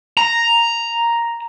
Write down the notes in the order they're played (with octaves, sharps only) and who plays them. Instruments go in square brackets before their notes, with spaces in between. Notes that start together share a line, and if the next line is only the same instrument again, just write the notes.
[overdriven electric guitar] A#5